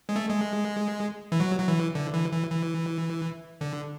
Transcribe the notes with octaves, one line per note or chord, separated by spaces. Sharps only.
G#3
A3
G#3
E3
F#3
F#3
E3
D3
E3
E3
E3
D3